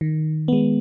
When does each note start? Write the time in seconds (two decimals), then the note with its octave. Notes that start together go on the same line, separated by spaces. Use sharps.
0.01 D#3
0.48 G#3 B3